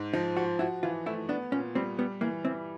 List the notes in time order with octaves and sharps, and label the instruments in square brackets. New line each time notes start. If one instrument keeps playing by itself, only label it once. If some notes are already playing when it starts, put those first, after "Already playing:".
Already playing: [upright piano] G#2
[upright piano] F3 [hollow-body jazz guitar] D#4
[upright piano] F3 [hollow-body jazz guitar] F#4
[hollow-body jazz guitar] E4 [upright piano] F#4
[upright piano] E3 [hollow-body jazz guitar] F4
[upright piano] A3 [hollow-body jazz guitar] E4
[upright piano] B3 [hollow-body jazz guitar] D4
[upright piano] A#2 [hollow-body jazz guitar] C#4
[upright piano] G3 [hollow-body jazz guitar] C4
[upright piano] G3 [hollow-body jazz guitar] B3
[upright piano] E3 [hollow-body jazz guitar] A#3
[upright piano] E3 [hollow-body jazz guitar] C4